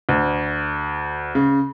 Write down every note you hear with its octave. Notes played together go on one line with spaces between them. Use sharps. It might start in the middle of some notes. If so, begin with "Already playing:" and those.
D2
C#3